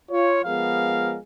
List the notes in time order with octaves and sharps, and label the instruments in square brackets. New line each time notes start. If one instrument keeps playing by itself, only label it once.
[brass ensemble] F4 C#5
F3 G#3 B3 G#4 A#4 F5